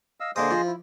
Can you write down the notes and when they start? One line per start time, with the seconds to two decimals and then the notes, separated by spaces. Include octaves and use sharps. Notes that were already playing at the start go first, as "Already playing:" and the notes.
0.20 D#5 F5 E6
0.36 D3 A#3 G#4 C5 D#5 D#6
0.51 F3
0.67 E4